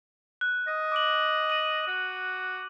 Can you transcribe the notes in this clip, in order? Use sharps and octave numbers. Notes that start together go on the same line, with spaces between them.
F#6
D#5
D6 D7 F#7
D#7 F#7
F#4